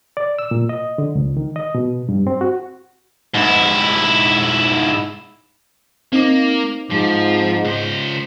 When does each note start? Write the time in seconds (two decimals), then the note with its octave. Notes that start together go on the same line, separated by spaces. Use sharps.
0.17 D5
0.39 E6
0.51 A#2
0.69 D#5
0.98 D3
1.15 C#2
1.37 D#3
1.56 D#5
1.75 B2
2.09 G2
2.27 C4
2.41 F#4
3.34 G#2 E4
6.13 A#3 C4 D#4 D6
6.91 G#2 F3
7.65 C#2 C5